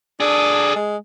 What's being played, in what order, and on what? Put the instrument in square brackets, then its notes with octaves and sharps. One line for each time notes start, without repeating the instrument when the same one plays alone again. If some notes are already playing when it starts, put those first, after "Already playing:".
[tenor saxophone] D4 [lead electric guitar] G#4 A4
[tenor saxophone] G#3